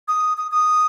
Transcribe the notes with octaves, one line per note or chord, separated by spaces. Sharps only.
D#6
D#6
D#6